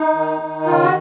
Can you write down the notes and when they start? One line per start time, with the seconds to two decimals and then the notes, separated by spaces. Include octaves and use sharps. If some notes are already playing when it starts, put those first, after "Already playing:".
Already playing: D#4
0.15 D#3
0.41 D#3
0.66 C#3 F4
0.83 F#4